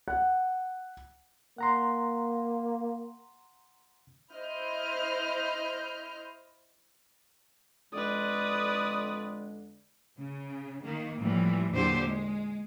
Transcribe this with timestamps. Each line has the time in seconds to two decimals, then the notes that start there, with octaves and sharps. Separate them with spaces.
0.08 F#5
1.58 A#3 F#5 A#5 C6
4.33 E4 C5 D#5 F6 G6
7.93 F2 D3 G#3 B4 D5 D#6
10.18 C#3
10.84 D#3 A#3
11.20 A2 E3 F3 G3
11.73 E2 A#2 D3 F#3 G4 C5
12.04 G#3